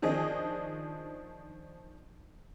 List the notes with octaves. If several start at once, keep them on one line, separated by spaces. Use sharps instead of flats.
D#3 F3 D4 G#4 D#5